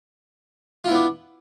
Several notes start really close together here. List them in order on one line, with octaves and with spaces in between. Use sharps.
F4 E4 B3 D4